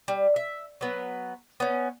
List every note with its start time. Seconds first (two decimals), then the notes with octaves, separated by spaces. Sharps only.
0.08 G3
0.36 E5
0.81 F#3 B3
1.60 B3 C#4